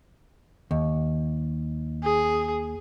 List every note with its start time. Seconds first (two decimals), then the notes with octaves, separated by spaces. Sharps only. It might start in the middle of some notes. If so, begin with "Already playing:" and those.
0.71 D#2
2.04 G#4